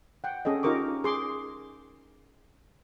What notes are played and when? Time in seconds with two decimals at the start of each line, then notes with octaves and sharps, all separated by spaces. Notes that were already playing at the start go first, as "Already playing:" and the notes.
0.24 F#5 G5
0.45 C#4 G#4 A4 D#5
0.63 D#4 F4 G4 A#4 C#6 D6
1.04 G#4 C6 D6